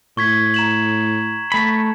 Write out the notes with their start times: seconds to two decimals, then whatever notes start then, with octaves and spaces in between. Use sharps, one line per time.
0.17 A2 C#6 G#6 B6
0.54 A#5 E7 F#7
1.52 A3 B5